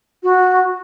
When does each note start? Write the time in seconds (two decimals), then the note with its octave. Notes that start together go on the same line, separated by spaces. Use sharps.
0.23 F#4